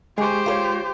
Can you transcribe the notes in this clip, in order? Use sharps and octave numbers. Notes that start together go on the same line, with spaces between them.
G#3 G4 G#4 C5 C#6
F4 A#4 C#5